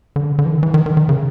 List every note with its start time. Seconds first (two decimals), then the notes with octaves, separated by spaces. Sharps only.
0.16 D3
0.39 D3
0.46 E3
0.51 D#3
0.63 E3
0.74 D#3
0.86 D#3
0.97 D#3
1.09 C#3